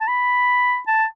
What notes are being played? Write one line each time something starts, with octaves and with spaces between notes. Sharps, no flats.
A5
B5
A5